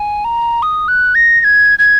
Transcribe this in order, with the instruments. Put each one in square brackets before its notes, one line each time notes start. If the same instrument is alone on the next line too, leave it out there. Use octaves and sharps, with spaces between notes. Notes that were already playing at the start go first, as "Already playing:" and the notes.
Already playing: [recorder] G#5
A#5
D#6
F#6
A#6
A#6
G#6
G#6